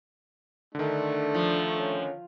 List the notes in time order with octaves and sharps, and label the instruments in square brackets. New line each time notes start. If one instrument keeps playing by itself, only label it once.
[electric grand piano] D3 D#3 [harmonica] A3 [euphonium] D4
[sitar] F3
[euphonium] C#4